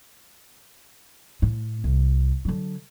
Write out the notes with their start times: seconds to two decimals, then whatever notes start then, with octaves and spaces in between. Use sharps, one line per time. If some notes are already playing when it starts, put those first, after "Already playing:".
1.42 A2
1.84 C2
2.45 D3 F#3